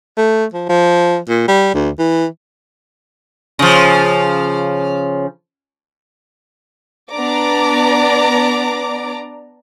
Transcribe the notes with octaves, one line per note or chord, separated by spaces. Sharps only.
A3
F3
F3
A#2
G3
D2
E3
C#3 F3
B3 D4 D5 A#5 D6